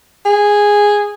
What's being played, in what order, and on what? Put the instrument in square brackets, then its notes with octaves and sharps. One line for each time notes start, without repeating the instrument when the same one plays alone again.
[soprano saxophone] G#4